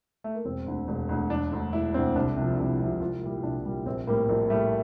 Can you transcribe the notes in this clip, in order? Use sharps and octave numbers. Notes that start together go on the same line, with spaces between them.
A3
A#3
E1 C4
D2 D3
E1
D2 D3
E1 D4
D2 D3
E1 E4
D2 D3 C4
C2 D4
C3 F3
D4
C2 E4
C3 F3
C2 F4
A#2 G3 E4
C2 D4
A#2 G3
A#1 C4
A2 G3 A#3
A#1 A#3
A2 G3 A3